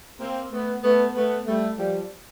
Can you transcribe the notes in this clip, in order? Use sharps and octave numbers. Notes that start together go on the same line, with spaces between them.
A#3 C4
A3 B3
A3 B3
A3 B3
G3 A3
F3 G3